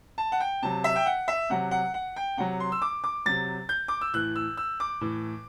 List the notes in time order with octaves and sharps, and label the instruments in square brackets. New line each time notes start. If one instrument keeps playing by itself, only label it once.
[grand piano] A5
F#5
G5
C3 F#3 A5
E5
G5
F#5
E5
C3 F#3 F#5
F#5
F#5
G5
C3 F#3 F#5
C6
E6
D6
D6
C3 F#3 A6
G6
D6
E6
A2 E3 F#6
E6
E6
D6
A2 E3